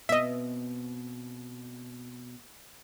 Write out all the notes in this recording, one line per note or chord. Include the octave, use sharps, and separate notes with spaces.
B2 B3 C4 D#5 E5